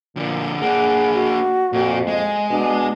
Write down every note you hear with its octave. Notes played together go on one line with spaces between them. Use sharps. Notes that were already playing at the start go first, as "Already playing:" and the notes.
A#2 D3 F3
A#3 D4 G#4 F#5
F#4
F2 A#2
G#3 D#5
B2 D4